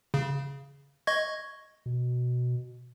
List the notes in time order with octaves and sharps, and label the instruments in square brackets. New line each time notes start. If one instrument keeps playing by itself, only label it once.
[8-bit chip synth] C#3
D#5 C#6 G#6
[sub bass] B2